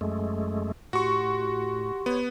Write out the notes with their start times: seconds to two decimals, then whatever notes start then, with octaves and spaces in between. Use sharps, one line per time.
0.01 F#2 G#3 A3
0.93 A2 F#4 G4 C6 C#6
2.06 B3 C#5